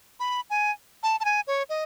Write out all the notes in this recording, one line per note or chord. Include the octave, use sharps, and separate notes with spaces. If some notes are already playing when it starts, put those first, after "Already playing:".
B5
G#5
A5
A5
G#5
C#5
D#5